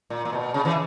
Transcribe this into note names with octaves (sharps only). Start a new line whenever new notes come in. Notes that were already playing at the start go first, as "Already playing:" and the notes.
A#2
A#2
B2
C#3
C#3 E3